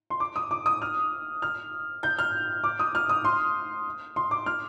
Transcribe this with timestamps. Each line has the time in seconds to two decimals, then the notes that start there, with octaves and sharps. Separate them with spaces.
0.10 C6
0.20 D6
0.36 D#6
0.51 D6
0.66 D#6
0.82 F6
1.42 F6
2.03 G6
2.19 F6
2.64 D6
2.79 D#6
2.95 F6
3.09 D#6
3.25 C6
4.16 C6
4.31 D6
4.46 F6